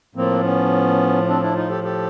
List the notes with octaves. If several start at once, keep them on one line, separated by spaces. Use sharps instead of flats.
A2 F3 A#3 C4
B3 C#4
C4 D4
D4 E4
D#4 F4
G4 A4
G4 A4